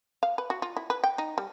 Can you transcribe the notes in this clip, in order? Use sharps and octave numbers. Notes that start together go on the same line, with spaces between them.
F5
B4
F#4
F4
E4
B4
G5
D#4
G3